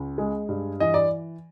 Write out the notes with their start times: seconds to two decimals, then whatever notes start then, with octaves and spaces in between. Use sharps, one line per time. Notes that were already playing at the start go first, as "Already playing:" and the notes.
Already playing: C#2
0.18 G#3
0.49 G2
0.80 E3 D#5
0.94 D5